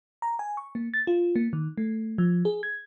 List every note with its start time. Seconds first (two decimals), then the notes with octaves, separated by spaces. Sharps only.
0.22 A#5
0.39 G#5
0.57 C#6
0.75 A#3
0.94 A6
1.07 F4
1.36 A#3
1.53 D#3
1.77 A3
2.18 F3
2.45 G#4
2.63 G#6